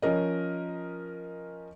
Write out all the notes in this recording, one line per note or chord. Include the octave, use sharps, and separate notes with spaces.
F3 C#4 A#4 D#5